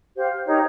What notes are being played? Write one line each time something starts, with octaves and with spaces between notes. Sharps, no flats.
G4 C5 F5
D#4 G4 A#4 C#5